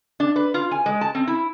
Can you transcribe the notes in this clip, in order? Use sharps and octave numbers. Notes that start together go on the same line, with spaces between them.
D4
B4
F4
G#5
G#3
A5
C4
E4